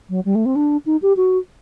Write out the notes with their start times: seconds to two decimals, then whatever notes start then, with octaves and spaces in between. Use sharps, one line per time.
0.09 F#3
0.25 G3
0.35 A3
0.45 C4
0.55 D4
0.86 D#4
1.02 G4
1.16 F#4